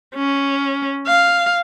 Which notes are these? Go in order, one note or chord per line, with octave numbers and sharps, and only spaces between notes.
C#4
F5